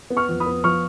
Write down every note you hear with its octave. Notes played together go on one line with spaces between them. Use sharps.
B3
C#6 F6
F2
B5 D#6
B3
F3 C#6 F6